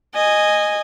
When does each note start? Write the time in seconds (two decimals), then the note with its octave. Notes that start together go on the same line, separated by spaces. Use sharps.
0.14 D#5 G#5